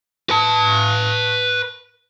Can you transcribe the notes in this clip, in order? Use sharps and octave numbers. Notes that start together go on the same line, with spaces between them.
B4 A5